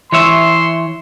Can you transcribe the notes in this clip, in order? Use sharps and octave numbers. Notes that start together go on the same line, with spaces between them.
E3 C#5 E5 C6